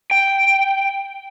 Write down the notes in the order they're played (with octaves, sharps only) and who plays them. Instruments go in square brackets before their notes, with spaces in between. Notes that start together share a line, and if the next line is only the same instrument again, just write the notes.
[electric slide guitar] G5